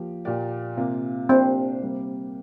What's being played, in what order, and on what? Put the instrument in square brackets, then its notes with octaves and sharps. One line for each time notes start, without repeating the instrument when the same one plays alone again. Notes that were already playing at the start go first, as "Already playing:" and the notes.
Already playing: [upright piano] F3 A#3 G4
A#2 A#3 G4 D5
C3 A#3 F4
[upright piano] A#3 D4 G4 C5 [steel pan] C4
[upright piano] C3 G3 A#3 G4